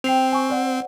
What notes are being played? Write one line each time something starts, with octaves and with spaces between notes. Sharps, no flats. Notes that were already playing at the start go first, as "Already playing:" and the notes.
C4 G5 C7 F7
G#5 C#6
C5 D5 F#5